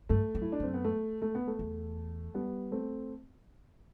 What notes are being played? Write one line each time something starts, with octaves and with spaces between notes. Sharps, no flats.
G2 A3
F#2
E4
D4
F#2 C4
B3
A3
A3
B3
A3
E2
G3 B3
A3 C4